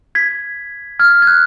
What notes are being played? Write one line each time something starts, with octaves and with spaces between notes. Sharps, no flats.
G#6 B6
F6 G#6
G#6
F#6